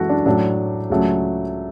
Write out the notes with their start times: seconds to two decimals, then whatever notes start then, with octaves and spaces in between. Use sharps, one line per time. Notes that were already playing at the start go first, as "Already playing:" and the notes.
Already playing: F#2 E3 G#3 F#4 A4
0.09 D4
0.26 A2 F#3 A3 D4
0.90 C#2 C#3 F#3 A3